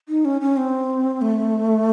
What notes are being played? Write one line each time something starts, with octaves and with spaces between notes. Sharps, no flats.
D#4
C#4
C#4
C4
A3